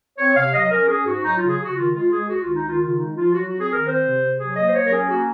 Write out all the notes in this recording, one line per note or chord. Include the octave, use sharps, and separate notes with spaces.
C4 C#5
C3 F5
F#3 D#5
C#4 A#4
C#4 G#4
G#2 F#4
F#3 D#4
C#3 F4
G#4
C#3 F#4
D#3 F4
G#3 F4
G#3 G#4
C#2 F#4
D#3 F4
D#4
D#3 F4
C#3 F4
G#3 D#4
F3 F4
F#3 F#4
C4 F#4
G#4
D#3 A#4
C4 C5
C3
C3
F#3 G#4
A#3 D#5
C5
F#3 C#5
A#4
C#4 G#4
A#3 F#4